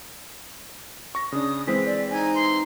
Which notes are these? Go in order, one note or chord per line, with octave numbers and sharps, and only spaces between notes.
C#6 A#6
C#3 D4 D#6
E3 G#3 C4 B6
D5
D#4 G#5
C6